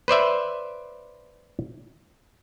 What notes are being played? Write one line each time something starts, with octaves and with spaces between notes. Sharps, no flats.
B4 C5 D5 E5